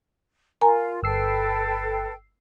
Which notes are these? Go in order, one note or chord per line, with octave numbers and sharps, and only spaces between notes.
F4 A#4 G#5 A#5
G1 A4 B4 G5 E6 C7